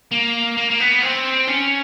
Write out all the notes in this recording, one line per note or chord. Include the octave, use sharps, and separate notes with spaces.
A#3
A#3
A#3
B3
C4
C#4